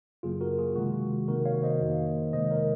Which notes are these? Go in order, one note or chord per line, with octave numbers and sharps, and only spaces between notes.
F#2 C#3 F#3 A#3 F4 G#4
F#4 A#4
F4 G#4
C3 D#3 G#3 F#4
C3 D#3 A#3 F#4 A#4
C#5 F5
C5 D#5
F2 D#3 A#3
C3 D#3 G#3 C5 D#5
A#4 C#5